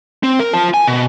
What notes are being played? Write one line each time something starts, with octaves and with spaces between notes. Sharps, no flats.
C4
A#4
F4 A5
G#5
B2